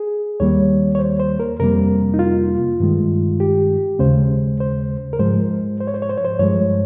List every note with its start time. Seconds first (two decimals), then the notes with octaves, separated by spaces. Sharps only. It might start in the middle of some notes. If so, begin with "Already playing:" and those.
Already playing: G#4
0.40 D#2 D#3 G3 A#3 C#5
0.95 C#5
0.99 C5
1.20 C5
1.40 A#4
1.60 F2 C3 G3 A#3 A#4
2.14 D#4
2.19 F4
2.80 G2 D#3 G#3
3.40 G4
3.99 D#2 C#3 G#3 C5
4.60 C5
5.13 A#4
5.19 G#2 F3 G#3 C5
5.80 C5
5.87 C#5
5.94 C5
6.02 C#5
6.09 C5
6.18 C#5
6.25 C5
6.39 G2 F3 G#3 C#5